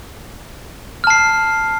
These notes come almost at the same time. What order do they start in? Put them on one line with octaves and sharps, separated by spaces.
F6 A5 C7